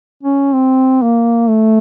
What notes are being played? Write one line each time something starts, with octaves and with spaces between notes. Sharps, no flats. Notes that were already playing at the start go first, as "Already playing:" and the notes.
C#4
C4
A#3
A3